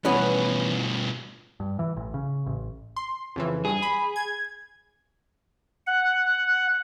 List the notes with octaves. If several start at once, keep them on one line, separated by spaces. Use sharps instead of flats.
G2 B2 E3 B3 C#4
G2
E3
A1
C#3
A1
C6
F2 C#3 E3
G2 G#4
B5
G#6
F#5